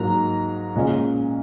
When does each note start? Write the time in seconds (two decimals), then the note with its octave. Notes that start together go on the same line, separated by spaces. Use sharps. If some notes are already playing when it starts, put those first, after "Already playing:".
Already playing: G#2 F#3 A#3 A#5
0.76 A#2 G#3 C#4